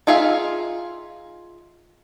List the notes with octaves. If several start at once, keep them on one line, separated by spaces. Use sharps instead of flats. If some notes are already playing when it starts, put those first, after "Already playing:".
D#4 F4 G#4 E5 F5